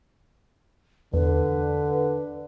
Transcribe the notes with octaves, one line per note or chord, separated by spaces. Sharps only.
E2 D3 B4